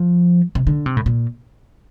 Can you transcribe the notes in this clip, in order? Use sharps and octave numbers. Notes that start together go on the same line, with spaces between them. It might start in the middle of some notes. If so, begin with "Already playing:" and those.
Already playing: F3
C3
D3
C3
A2
A#2